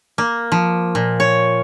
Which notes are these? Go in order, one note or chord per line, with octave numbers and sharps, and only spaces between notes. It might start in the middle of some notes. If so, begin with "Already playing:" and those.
A#3
F3
A#2
C#5